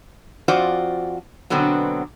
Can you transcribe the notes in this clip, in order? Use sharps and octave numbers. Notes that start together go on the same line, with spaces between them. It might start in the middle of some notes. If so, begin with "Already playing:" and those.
F2 F4 F#4 C5 D5
B2 D3 F#3 B3 C4